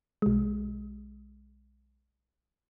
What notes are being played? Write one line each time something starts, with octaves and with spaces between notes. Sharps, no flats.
B1 G#3